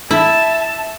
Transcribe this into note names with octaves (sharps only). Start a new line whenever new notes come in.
E4 E5 A5